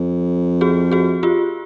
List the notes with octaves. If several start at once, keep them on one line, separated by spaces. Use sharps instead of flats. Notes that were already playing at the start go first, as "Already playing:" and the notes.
Already playing: F2
F#4 G#4
F#4 G#4
F4 G4